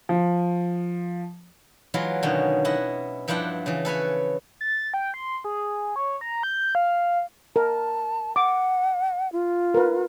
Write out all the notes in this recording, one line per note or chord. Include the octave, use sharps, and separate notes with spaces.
F3
E3 F#3 G#3 E4 F4
B2 D3 D#3 C#4
E4 D#5 F#5
G2 F3 D4 E4 F#5 G5
C#3 E3
A4 B4 C#5 G#5
A6
G5
C6
G#4
C#5
A#5
G6
F5
A#4 A5
F#5 D6
F4
A#4 B4